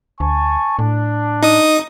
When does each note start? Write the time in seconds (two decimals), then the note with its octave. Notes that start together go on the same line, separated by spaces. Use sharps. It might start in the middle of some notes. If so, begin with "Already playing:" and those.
0.20 D2 G#5 A5 C#6
0.79 A2 D4
1.43 D#4 D#6